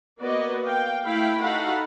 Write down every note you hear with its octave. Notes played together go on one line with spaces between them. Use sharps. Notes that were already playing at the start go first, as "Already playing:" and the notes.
A#3 B3 F#4 B4 D5 D#5
F5 G5
A3 E4 F5 G5 B5
D#4 F#4 A4 F5 F#5 B5